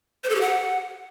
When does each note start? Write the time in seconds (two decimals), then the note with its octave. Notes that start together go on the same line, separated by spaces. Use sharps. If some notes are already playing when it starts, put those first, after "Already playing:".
0.24 C5
0.29 A4
0.35 G4
0.41 F#5